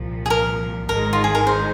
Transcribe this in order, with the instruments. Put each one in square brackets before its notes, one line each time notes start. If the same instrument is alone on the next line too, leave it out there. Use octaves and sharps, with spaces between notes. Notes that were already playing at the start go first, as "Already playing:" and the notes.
Already playing: [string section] C2 A#2 F3
[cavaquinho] G#4
A#4
[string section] G#1 G#2 D#3 G#3 [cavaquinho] A#4
[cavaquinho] F4
G#4
A#4
C5